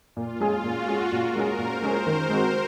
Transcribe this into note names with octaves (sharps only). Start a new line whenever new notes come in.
A#2 F4
G#3 C#4 G#4
A#2 F#4
G#3 C#4 G#4
A#2 A#4
G#3 C#4 G#4
A#2 C5
G#3 C#4 G#4
D#3
G#3 C4 F#4